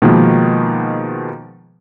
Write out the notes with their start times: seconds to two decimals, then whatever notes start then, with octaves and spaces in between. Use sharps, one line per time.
0.02 B2 D#3 F3 G#3 A#3 B3